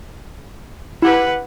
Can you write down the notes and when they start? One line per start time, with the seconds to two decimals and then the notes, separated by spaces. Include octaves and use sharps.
1.02 E4 G4 B4 F#5